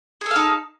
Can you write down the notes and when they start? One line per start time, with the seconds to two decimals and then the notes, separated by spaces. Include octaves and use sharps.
0.21 G#4
0.26 A4
0.31 F5
0.36 D#4